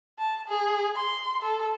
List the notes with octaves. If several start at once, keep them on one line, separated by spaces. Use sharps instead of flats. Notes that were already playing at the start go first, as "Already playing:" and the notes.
A5
G#4
C6
A4